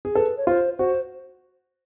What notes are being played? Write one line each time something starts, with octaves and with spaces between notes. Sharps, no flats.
G#4
A4 B4
C#5
F4 C5
F#4 C5